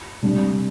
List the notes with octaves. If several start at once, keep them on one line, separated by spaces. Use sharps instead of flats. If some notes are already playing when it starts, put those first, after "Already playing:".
C3 G3 D4